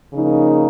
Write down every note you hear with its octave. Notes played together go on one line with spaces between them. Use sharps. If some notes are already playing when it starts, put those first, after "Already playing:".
C#3 F3 A#3 D#4